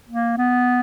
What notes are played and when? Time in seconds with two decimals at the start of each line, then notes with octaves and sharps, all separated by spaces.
0.09 A#3
0.38 B3